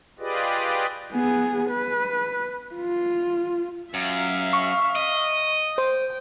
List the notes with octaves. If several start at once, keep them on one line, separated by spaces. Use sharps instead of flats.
F4 G4 G#4 B4 D5 D#5
B3 G#4
B4
F4
F#2 E5 F5
C#6
D#5
C5 G5